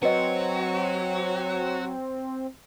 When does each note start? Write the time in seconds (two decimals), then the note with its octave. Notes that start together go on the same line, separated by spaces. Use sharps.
0.03 F#3 C4 F#4 B4 D#5